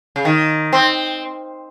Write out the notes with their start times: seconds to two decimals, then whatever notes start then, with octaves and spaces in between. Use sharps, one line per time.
0.16 C#3
0.25 D#3
0.73 C4